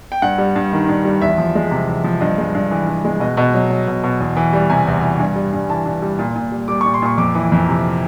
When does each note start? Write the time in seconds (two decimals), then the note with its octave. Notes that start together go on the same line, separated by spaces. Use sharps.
0.12 G5
0.22 G2 F#5
0.38 G3
0.56 G2
0.73 D#3
0.89 G2
1.05 G3
1.21 E2 E5
1.38 F3
1.55 G#3
1.71 C3
1.88 E2
2.04 F3
2.21 G2 D#5
2.38 G#3
2.55 G2
2.71 E3
2.87 G2
3.05 G#3
3.20 B2 D#5
3.37 B2 D#5
3.54 F#3
3.70 F#3
3.87 B2
4.04 B2
4.20 E2
4.37 E3
4.53 G3
4.70 C3 G#5
4.87 E2
5.02 E3
5.19 G2
5.36 G3
5.53 G2
5.69 E3 A5
5.86 G2
6.02 G3
6.19 A#2
6.35 A#2
6.52 G3
6.68 G3 D6
6.81 A#2 C#6
6.94 C6
7.02 A#2 C#6
7.18 F2 D6
7.35 E3
7.52 F2
7.68 C3